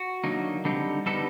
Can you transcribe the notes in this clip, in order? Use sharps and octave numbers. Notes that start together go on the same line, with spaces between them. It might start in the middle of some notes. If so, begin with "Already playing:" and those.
Already playing: F#4
D3 F#3 A#3 D#4
D3 G3 C4 D#4
D3 G3 B3 D#4 A4